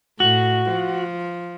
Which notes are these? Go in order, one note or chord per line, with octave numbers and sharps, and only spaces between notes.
A2 F#4
F3